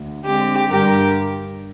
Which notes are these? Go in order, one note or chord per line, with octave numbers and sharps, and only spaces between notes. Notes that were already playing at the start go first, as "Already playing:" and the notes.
Already playing: D2
D3 G#3 C4 G4
G2 D3 G3 G4 A#4